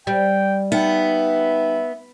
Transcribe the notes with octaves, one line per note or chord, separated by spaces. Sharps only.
G3 G5
B3 D#4 E5 G5